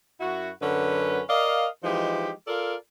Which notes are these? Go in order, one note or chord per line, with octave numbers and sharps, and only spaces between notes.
F#2 E4 F#4
F#2 D3 C#4 B4
A#4 D5 D#5 F5
E3 F3 G#3 D#4 G4
F4 A4 A#4 D5 F5